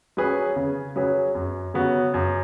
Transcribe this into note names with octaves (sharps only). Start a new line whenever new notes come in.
F#3 C#4 G#4 B4
C#3
F#3 C#4 G#4 B4
F#2
C#3 F#3 B3 F#4
F#2